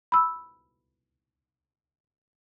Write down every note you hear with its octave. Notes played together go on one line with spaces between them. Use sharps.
B5 E6